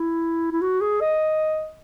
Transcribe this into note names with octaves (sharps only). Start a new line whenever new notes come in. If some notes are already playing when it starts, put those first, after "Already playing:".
Already playing: E4
E4
F#4
G#4
D#5